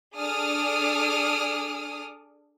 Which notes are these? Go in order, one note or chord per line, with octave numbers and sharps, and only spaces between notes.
D4 G#4 A4 D6 D#6 F6